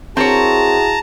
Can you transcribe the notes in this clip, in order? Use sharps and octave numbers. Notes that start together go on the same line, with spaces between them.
C4 E4 F#4 G#4 A#4 C#5 A5 A#5